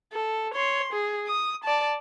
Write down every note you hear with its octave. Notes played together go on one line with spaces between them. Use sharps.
A4
C#5 C6
G#4
D#6
D5 A5